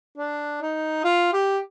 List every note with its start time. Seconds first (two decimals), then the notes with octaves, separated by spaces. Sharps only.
0.18 D4
0.61 D#4
1.04 F4
1.33 G4